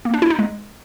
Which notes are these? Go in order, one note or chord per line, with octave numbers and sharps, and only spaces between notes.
A#3
D4
E4
D#4
G#3